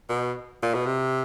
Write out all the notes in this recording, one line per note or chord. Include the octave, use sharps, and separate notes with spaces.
B2
A#2
B2
C3